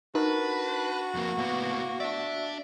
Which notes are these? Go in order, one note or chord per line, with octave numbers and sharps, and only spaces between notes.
D4 D#4 F#4 A#4 B4
F2 A#3
A2 A#3 B3
D4 D5 E5